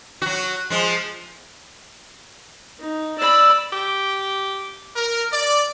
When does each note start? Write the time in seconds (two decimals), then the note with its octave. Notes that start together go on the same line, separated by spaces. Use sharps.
0.22 F#3 F#4
0.70 F3 G#3
2.79 D#4
3.18 D5 B5 E6
3.72 G4
4.96 A#4
5.32 D5